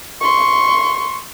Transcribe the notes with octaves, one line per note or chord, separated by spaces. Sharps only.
C6 C#6